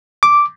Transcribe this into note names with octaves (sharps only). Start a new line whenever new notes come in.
D6